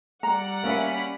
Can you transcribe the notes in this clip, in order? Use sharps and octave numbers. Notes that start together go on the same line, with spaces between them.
G3 D5 F#5 A#5
A#3 C#4 E5 B5